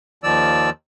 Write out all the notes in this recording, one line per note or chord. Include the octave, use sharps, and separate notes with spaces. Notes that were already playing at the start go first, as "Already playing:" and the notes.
D#2 D#3 F3 D5 E6